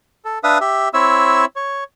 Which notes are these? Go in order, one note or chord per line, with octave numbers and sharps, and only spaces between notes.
A4
D4 B4 E5 F5 D#6
G4 E5
C4 E4 C#5 E5 E6
C#5